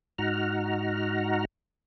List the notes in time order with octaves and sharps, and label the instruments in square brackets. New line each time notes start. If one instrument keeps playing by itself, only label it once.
[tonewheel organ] G#2 D#4 F#4 F#5 A#5 F6